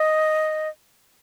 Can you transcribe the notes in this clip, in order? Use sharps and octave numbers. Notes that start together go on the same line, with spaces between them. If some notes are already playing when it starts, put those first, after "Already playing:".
Already playing: D#5